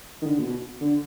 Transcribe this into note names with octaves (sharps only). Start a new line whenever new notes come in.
D#3
D3
A#2
B2
D3